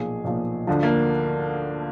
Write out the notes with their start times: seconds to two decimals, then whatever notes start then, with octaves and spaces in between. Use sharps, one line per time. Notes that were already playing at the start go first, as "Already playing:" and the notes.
Already playing: B1 A#2 F3 G#4
0.24 B1 A#2 F3
0.67 D2 D3 F3
0.83 A#3